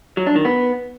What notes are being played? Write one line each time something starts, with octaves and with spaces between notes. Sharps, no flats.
F#3
D4
D#3
B3